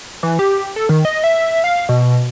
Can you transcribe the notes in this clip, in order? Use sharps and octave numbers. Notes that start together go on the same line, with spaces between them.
E3
G4
A4
D#3
D#5
E5
F5
B2